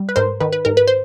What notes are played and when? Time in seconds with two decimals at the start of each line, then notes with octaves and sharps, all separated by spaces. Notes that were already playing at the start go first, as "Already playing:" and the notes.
Already playing: G3
0.09 B4
0.16 G#2 A#4 C5
0.40 D#3 B4
0.52 B4
0.65 G#2 A#4
0.77 B4
0.88 C5